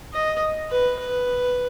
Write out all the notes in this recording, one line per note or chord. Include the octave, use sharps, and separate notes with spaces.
D#5
B4
B4